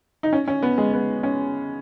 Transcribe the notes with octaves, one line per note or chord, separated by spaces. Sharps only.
D#4
C#4
C#4
B3
G#3
B3
C#4